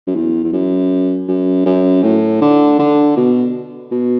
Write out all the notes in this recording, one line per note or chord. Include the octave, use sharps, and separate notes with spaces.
F#2
E2
E2
F#2
F#2
F#2
A2
D3
D3
B2
B2